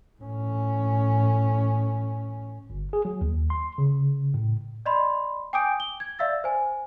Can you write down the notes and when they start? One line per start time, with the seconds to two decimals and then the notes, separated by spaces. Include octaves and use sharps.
0.21 A2 C#4
2.70 G1
2.93 G#4
3.05 F#3
3.21 D#2
3.50 C6
3.78 C#3
4.34 A2
4.86 D5 D#5 B5 C6
5.53 G5 G#5 D6 D#6 G6 D7
5.80 G7
6.00 G#6
6.19 D5 E5 F5 E6 A6
6.44 C5 G#5